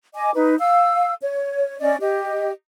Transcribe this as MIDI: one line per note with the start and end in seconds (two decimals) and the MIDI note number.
0.15 0.31 75
0.15 0.31 80
0.15 0.31 86
0.34 0.55 63
0.34 0.55 71
0.59 1.13 77
0.59 1.13 88
1.22 1.80 73
1.80 1.95 61
1.80 1.95 74
1.80 1.95 75
2.01 2.50 67
2.01 2.50 75